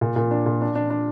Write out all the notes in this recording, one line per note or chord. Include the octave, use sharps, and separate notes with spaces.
A#2
A#2
D4
A#2
D4
D4
D4